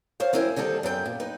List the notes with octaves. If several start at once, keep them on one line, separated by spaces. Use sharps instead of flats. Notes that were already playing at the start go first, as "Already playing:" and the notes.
C5 C#5 F5
F#2 C4 C#4 E4 G4 A#4
D3 D#3 G3 C4 A4
F#2 B3 A#4 G5
A#2
D#4 B4